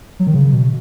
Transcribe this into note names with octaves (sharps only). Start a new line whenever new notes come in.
F#3
D#3
C#3
B2